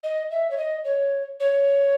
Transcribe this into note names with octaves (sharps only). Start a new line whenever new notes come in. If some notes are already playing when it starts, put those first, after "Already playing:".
D#5
E5
C#5
D#5
C#5
C#5